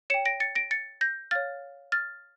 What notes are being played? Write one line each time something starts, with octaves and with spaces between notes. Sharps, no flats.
C#5 G5 C#7 E7
A#6 D7
A6 C#7
A#6 D7
A6 C#7
G6 A#6
C#5 F5 F6 A6
F6 A6